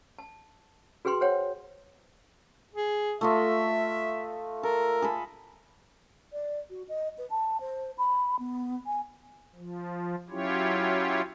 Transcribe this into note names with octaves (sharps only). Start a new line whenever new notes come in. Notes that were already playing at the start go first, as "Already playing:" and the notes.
A5
F#4 G#4 B4 G5 C6
C5 C#5 F#5 G5
G#4
A3 F4 D#5 E5
A4 A#4
G#4 A4 B5
D5
F#4
D#5
B4
A5
C5
B5
B3
G#5
F3
F#3 C#4 E4 F4 G4 C#5